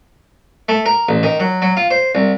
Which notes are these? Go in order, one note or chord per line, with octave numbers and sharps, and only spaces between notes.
A3
A#4
A1
D#3
F#3
F#3
F4
C5
C2